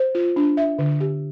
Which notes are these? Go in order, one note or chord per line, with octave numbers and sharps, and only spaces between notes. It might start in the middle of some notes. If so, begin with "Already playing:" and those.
Already playing: C5
F4
D4
E5
D3
G4